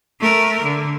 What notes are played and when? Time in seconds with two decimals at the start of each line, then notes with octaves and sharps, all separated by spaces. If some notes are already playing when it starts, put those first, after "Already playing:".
0.20 A3 A#4
0.62 D3